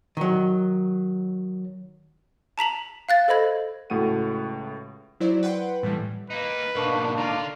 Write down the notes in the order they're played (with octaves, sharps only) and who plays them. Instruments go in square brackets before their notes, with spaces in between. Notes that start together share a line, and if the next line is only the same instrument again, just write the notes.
[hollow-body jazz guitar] D#3 F#3
[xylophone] A5 A#5 B6 F#7
F5 F#6 A6
A4 C5 D#5 B5 G#6
[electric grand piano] C#2 A2 A3 F#4 F#5 D#7
[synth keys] F#3 E4 C5 D5
B4 F#5 G5 C6
A2 E3 G3
[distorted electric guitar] A#3 D#4 [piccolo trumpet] B4
[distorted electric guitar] G#2 B2 [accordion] A#3 D4 D#4 [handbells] A#4 C#6
[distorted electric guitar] D3 D5 [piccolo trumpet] F4 [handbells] A#5